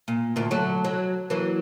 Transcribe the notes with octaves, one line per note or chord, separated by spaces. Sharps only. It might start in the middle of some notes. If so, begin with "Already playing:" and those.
A#2
D2 A#2
D3 F#3 A3
F#3
E3 F#3 A#3